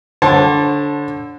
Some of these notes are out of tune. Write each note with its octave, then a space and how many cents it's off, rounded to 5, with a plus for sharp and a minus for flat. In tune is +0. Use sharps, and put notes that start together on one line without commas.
D3 -10 C#5 -45 A5 +0